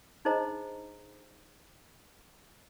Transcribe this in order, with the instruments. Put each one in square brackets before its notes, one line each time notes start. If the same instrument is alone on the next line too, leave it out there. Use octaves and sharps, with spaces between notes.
[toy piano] D4 D#4 G#4 C5 D#5 A#5